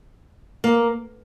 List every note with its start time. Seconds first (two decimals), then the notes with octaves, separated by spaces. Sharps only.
0.64 A#3